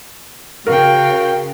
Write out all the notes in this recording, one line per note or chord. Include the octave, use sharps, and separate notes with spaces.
C#3 F#4 A#4 F5 G5